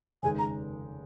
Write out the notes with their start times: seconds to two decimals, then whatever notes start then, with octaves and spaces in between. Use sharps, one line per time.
0.23 F1 D#2 C#3 G#3 D#4 G#5
0.39 A#5